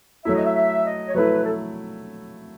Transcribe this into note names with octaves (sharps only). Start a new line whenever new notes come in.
F#3 A3 E4 E5
D#5
E5
E5
D#5
C#5
F#3 A3 E4 B4
A4